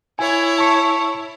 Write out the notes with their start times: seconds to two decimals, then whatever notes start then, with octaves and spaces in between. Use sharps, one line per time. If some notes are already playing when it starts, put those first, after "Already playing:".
0.19 E4 C#5 G#5
0.58 A5 C#6